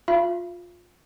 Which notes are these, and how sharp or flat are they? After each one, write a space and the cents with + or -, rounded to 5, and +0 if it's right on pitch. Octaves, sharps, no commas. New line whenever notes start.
F4 +20 F5 -40 B5 -10